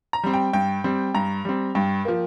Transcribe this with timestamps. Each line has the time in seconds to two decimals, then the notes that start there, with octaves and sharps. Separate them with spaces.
0.13 A#5
0.23 G3 C4
0.34 G5
0.53 G2 G5
0.84 G3 C4
1.15 G2 A#5
1.45 G3 C4
1.75 G2 G5
2.05 F3 A#3